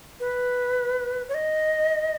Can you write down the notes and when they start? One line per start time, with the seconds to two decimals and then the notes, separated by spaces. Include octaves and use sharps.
0.20 B4
1.29 C#5
1.34 D#5